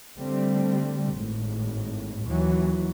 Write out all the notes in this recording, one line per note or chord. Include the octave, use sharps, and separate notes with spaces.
D3 G3 A3 C4
G#1 A2
D#2 E3 F#3